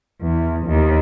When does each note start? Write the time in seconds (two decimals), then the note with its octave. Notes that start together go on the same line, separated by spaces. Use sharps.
0.21 E2
0.66 D#2